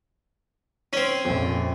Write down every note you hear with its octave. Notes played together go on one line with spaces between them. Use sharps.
C4 C#4
A#1 F2